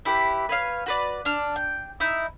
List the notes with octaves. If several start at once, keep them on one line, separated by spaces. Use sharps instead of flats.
E4 G4 B4
B4 C#5 F5
F#4 B4 D5
D4 F6
G5
D#4 E4